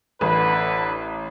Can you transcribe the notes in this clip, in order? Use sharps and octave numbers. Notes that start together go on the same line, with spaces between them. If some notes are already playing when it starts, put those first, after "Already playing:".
A1 D3 B4